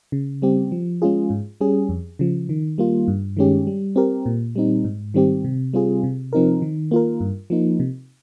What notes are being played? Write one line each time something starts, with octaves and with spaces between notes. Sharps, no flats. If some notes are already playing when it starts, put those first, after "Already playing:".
C#3
G3 C4 G4
F3
G#3 C#4 F4 G#4
G#2
G3 C#4 G#4
F2
C#3 F3
D#3
G3 A#3 F4
G2
D#3 G#3 C#4 G4
G3
C4 G4 A#4
A#2
G3 C4 D#4
G#2
D#3 G3 C4 G4
C3
G3 C4 F4 G#4
C3
F3 C4 D#4 A#4
D#3
A#3 F4 A#4
G2
F3 A#3 D#4
C3